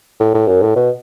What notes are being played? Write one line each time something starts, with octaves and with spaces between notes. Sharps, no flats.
A2
A2
F#2
A2
B2